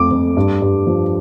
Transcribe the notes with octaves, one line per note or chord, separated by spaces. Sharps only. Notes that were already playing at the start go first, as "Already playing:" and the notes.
Already playing: F2 A3 D6
F2
G2
G2
F3